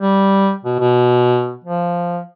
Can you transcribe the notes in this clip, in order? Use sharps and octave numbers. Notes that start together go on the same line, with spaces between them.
G3
B2
B2
F3